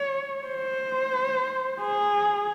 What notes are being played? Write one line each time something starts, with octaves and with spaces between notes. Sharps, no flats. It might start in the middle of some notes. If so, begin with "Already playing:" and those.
Already playing: C#5
C5
G#4